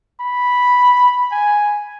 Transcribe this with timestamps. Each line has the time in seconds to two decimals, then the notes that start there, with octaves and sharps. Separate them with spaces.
0.20 B5
1.31 G#5